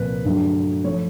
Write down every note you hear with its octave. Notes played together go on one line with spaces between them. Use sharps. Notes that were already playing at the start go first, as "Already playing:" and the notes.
Already playing: C2 A#2 F3 B4
G2 D3 F#3 A3
F3 A3 C#5